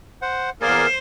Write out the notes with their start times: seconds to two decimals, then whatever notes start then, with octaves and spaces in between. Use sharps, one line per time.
0.22 C5 F#5
0.62 E2 A#3 G#4 A#4 C5 D5 G#5